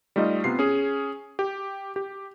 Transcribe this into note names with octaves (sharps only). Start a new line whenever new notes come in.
G3 A3 D#4 F4 D#5
C3 B3 F4 C7
C#4 G#4
G4
G4